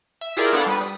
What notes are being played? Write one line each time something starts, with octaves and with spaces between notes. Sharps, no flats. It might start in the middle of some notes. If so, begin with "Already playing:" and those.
E5
E4 F4 G4 G#4 A#4 D5
B3 D4 A4 D5 F5 F#5
G3 B4
D#6 B6